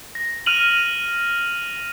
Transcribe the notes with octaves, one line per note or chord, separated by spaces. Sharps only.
A#6
F6 D#7 F7 F#7